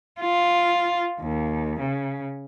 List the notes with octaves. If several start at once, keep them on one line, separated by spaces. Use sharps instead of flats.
F4
D#2
C#3